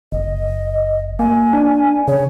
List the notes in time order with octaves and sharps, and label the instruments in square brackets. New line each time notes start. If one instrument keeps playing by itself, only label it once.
[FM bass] F#1 [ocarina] D#5
[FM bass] A#3 [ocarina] G#5
[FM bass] D4
[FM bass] C#3 [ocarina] C#5